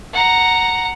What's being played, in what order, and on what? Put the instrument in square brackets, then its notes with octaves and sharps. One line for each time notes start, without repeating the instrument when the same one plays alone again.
[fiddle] F#5 A#5